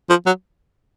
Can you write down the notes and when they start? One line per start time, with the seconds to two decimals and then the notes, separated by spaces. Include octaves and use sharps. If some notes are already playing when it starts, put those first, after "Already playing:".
0.10 F3
0.26 F#3